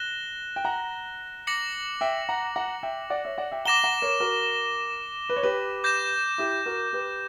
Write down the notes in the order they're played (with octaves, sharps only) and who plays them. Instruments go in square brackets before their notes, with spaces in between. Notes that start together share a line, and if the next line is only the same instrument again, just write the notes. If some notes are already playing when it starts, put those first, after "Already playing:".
Already playing: [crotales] F#6 A#6 E7 G7
[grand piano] G5
F#5 A#5
[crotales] D6 A#6 C#7 F#7
[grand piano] E5 G5
F#5 A#5
F#5 A#5
E5 G5
D5 F#5
C#5 E5
D5 F#5
E5 G5
[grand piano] F#5 A#5 [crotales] D6 A#6 E7 G7
[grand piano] F#5 A#5
A#4 C#5
F#4 A#4
B4
C#5
G4 B4
[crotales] D6 G6 A#6 E7
[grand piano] E4 G4
F#4 A#4
G4 B4